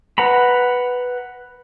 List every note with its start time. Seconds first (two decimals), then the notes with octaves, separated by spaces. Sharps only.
0.18 B4 F#5 A#5 B5